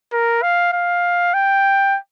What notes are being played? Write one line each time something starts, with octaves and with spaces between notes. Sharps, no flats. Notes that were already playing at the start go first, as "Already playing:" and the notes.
A#4
F5
F5
G5